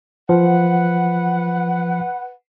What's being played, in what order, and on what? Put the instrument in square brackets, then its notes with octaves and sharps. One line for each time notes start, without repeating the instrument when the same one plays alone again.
[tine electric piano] F3 [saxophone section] B4 F#5